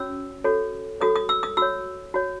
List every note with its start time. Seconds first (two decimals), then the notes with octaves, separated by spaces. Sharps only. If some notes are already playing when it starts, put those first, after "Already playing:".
Already playing: C#4 F#4 C#5 E6
0.44 F#4 A4 C#5
1.01 F#4 A4 C#5 D#6
1.16 D#6
1.29 E6
1.43 D#6
1.57 F#4 C#5 E6
2.14 F#4 C#5